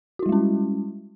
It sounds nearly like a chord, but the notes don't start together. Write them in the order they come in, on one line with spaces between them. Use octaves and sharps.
F#4 E4 G3 G#3 C#4